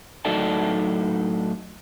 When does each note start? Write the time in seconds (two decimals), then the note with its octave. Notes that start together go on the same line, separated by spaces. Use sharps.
0.25 A2 F#3 D#4 A4 D5 A5